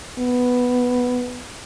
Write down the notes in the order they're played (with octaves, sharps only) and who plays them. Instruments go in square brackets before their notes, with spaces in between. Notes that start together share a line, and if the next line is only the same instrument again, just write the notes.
[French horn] B3